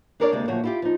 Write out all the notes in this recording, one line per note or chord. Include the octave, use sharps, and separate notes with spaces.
D4 G#4 A#4 C#5 D5
D2 C3 G#3 A#3 D5
D2 A#2 F3 F#3 F#4 C#5
E4 F4 G4
F3 D#4